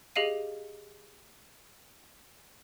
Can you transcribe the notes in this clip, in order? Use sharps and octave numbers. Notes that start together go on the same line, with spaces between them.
G4 G#4 D#5 F5 D#7